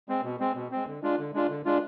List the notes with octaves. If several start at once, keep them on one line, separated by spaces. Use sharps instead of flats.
G#3 C4
B2
G#3 C4
B2
G#3 C4
D3
G#3 D4 F4
D3
G#3 D4 F4
D3
G#3 D4 F4